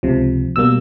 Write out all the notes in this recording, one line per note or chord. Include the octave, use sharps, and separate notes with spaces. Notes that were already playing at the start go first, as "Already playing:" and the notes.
C#2 C3 F3
B2 G3 A#3 E6